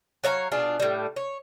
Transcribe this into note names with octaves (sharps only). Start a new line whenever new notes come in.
F#3 C#5 F5 A#5
B2 D4 F4 G#4
A2 G3
C#5